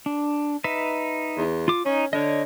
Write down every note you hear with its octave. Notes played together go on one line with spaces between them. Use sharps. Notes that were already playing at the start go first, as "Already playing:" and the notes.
D4
D#4 B4 E5
E2
F4 D6
C#4 D#4
D3 C#5 D#5